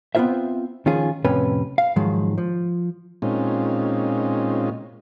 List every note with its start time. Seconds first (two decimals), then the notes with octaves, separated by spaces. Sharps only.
0.15 B3 C4 D#4 F4 C5 E5
0.86 D#3 F3 C#4 F4 G#4
1.25 F2 A2 C3 C#4 B4
1.78 F5
1.96 G#2 D#3 F3 F#3 G#3
2.38 F3
3.22 A#2 G#3 C4 C#4 D#4 F4